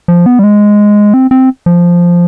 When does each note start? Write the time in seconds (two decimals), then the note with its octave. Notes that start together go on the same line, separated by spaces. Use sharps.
0.08 F3
0.26 B3
0.39 G3
0.44 G#3
1.14 C4
1.31 C4
1.66 F3